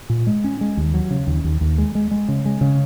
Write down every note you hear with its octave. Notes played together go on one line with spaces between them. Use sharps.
A#2
G#3
C#4
G#3
D#2
F#3
C#3
D#2
D#2
D#2
G#3
G#3
G#3
C#3
G#3
C#3